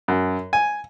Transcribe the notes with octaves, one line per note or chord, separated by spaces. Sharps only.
F#2
G#5